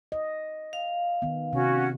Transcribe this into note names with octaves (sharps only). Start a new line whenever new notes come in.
D#5
F5
D#3 B3
C3 C#4 F#4